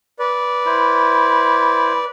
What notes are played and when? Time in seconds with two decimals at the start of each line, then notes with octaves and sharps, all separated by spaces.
0.19 B4 D5
0.66 E4 C5